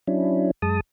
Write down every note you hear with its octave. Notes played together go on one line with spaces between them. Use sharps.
F#3 C#4 D4 E4
F#2 G#3 A5 D#6